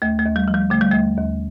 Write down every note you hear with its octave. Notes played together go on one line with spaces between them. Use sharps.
D#2 A3
A3
D#2
G3
F3
G3
D3 A3
G3
D#2 A3
D#2